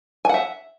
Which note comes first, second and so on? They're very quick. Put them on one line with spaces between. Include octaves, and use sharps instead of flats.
G#5 F#5 E5